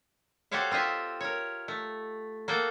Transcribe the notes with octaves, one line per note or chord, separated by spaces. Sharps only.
F#4 G4 A4 C5 C#5 F5
C4 F4 D#5 E5
A#4 C#5
A3
A#3 F#4 A4 G5